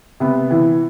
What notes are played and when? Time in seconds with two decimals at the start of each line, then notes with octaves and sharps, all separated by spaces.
0.20 C3 B3
0.51 E3